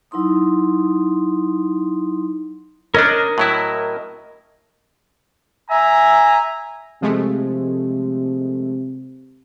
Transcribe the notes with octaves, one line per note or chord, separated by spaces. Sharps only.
F#3 D#4 E4 C6 D#6
C#4 D4 A#4 D#5 F6
A2 F#3 E4
E5 G#5 A#5
C3 F3 G#3 A3